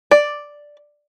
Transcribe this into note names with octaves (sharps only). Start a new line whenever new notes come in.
D5